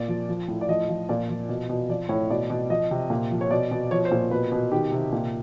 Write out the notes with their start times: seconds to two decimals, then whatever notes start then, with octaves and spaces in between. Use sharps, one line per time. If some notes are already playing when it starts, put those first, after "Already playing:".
Already playing: A#2 D5
0.08 F3
0.29 F3
0.48 A2
0.61 D5
0.69 F3 D#5
0.89 F3
1.09 A#2 D5
1.29 F3
1.49 B2
1.69 B2
1.89 F3 D5
2.09 A2 C#5
2.30 B2 D5
2.50 B2
2.70 F3 D#5
2.91 C3
3.10 A#2
3.31 F3
3.41 C#5
3.50 B2 D5
3.71 B2
3.91 F3 C#5
4.05 C5
4.12 A#2
4.31 B2 B4
4.52 B2
4.72 D#3 G4
4.92 C3
5.13 A#2